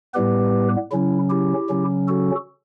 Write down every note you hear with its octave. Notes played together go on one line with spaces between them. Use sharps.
A2 G3 B3 G4 B4
C#3 F#3 C#4 E4
E4 G4
C#3 F#3 C#4
F#4 A4